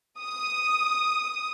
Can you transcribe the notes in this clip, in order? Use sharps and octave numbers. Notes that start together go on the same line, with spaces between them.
D#6